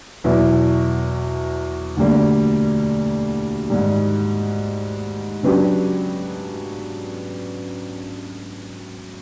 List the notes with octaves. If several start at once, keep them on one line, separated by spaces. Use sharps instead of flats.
E2 B2 F#3 B3 E4
D2 D3 G3 A#3
G#2 D#3 G3
C#3 F#3 B3 D4 G4